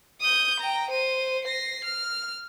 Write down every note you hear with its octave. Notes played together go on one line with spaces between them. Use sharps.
D#6 G6
G5 A#5
C5 D#7
A#6 C7
F6